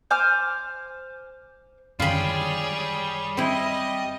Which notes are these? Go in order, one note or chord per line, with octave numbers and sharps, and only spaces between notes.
C5 G#5 D6 F6
F#2 D3 D#3 G3 F4 G#4 C#5 B5
C4 E4 D#5